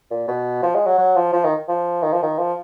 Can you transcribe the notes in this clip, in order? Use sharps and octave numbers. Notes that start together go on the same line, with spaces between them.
A#2
B2
F3
G#3
F#3
F#3
F3
F3
D#3
F3
D#3
F3
D#3
F3